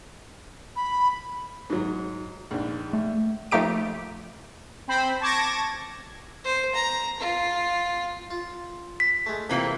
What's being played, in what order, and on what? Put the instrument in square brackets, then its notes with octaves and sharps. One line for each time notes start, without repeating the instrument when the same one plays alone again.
[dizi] B5
[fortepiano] G#2 F#3
A#1 G#2
[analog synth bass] A3
[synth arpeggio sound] F3 A3 A#3 D#4 G4 D7
[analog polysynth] C4 C5 B5
A5 C#6 D6 G#6 A#6
[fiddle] C5
A#5
F4
[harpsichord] F4
[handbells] B6
[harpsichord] G#3 A3
[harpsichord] F2 G5 [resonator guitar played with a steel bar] C3 E3 A#3